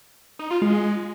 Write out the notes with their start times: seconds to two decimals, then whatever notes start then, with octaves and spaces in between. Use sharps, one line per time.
0.39 D#4
0.51 F4
0.62 G#3